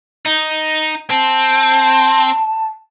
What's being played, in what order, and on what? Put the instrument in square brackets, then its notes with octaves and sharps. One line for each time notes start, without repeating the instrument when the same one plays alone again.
[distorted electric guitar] D#4
[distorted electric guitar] C4 [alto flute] A5